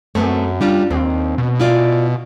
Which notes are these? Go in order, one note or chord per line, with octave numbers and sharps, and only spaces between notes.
F#2 A3 B3 C4
G3 C#4 D4 F4
D#2 C4
B2
E4 F4 D5